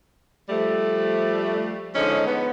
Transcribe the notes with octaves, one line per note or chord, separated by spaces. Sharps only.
F3 G3 A3
D3 F3 G#3 C#4 D#4
B3